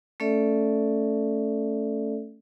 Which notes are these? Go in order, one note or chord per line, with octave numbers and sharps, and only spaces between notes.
A3 C#4 A4 D5 E5